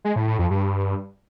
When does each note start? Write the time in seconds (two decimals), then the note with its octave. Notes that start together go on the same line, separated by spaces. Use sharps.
0.05 G#3
0.16 A2
0.28 A2
0.39 F2
0.50 G2